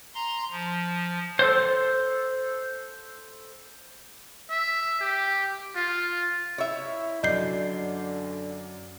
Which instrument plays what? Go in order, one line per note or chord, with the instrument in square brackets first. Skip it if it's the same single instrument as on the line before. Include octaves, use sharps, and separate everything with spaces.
[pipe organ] A#5 C6
F3
[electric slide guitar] A4 C5
[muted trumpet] E5
G4
F4
[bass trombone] E4 [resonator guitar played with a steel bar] C#5 E5
[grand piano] F#2 D5 G7 [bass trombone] D3 [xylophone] D#5 G6 C7